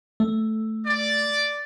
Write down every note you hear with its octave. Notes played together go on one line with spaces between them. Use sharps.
A3
D5